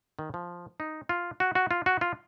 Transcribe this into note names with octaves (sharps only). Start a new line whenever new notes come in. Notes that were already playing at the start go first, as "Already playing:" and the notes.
D#3
F3
D#4
F4
F#4
F#4
F4
F#4
F4